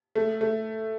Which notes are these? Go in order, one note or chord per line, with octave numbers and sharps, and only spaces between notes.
A3
A3